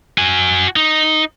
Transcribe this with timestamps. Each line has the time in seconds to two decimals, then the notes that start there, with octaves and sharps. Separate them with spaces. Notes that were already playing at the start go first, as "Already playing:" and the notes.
0.18 F#4 G#5
0.76 D#4